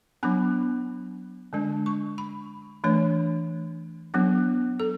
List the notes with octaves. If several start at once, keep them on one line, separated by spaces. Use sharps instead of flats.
F#3 B3 D4 B5
D3 G#3 D4
C#6
B5
E3 A3 D4 C#5
F#3 B3 D4
A4